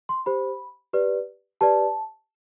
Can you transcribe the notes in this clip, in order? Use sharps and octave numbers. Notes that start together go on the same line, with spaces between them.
C6
G4 C5 B5
G4 B4 D5
G4 B4 D5 A5